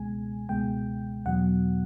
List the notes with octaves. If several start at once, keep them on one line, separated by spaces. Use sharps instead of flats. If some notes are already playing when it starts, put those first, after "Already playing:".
Already playing: C#2 B2 G#3 G#5
C#2 B2 G#3 G5
E2 B2 F#3 F#5